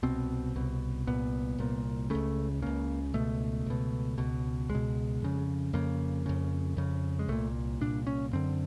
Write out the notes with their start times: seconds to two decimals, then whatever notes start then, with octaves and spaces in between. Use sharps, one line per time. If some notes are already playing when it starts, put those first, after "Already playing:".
0.03 C2 B2 C4
0.56 C2 B2
1.07 C2 A#2 B3
1.58 C2 A#2
2.10 C#2 C#3 A3
2.62 C#2 C#3 A#3
3.14 C#2 B2 A3
3.66 C#2 B2
4.18 C#2 B2
4.69 C#2 G#3
4.75 B2
5.22 F2 C#3
5.73 F2 C#3 A#3
6.26 F2 C#3
6.77 F2 C#3
7.19 G#3
7.28 C2 A#2 A3
7.81 C2 A#2 D4
8.07 C#4
8.33 F#2 D3 C4